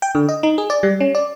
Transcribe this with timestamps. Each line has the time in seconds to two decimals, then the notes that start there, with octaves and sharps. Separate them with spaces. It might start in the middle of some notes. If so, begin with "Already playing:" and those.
0.02 G5
0.15 D3
0.29 D#5
0.43 D#4
0.58 G#4
0.70 D5
0.83 G3
1.00 C#4
1.15 D5